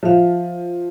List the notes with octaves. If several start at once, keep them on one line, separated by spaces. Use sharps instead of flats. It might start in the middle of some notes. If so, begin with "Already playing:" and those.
F3 E5 F5